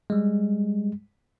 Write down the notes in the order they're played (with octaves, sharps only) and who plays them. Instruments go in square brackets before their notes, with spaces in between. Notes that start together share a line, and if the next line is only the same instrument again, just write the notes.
[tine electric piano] G3 G#3